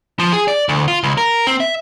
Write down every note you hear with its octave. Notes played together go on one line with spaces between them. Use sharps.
F3
G#4
D5
D2
F4
C#2
A#4
C4
E5